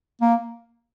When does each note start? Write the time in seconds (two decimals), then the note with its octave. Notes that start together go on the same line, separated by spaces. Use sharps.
0.21 A#3